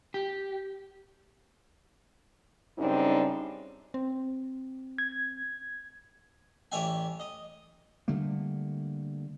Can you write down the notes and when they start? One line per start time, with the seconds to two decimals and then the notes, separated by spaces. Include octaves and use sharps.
0.14 G4
2.78 F#2 C#3 G3 C4 D4 D#4
3.94 C4
4.98 G#6
6.72 A1 C#5 D5 E5 G5 G#5
7.20 D#5
8.08 D3 G3 A3 A#3